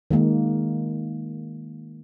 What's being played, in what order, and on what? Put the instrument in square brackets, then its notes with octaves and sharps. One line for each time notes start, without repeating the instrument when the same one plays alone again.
[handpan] D#3 G#3 A#3